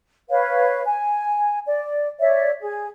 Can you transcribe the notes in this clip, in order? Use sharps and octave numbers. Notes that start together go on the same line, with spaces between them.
B4 C#5 F5
G#5
D5
C#5 D5 E5
G#4